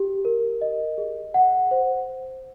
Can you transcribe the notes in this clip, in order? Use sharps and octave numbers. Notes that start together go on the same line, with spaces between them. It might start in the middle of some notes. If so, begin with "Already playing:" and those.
Already playing: G4
A#4
D#5
G#4
F#5
C5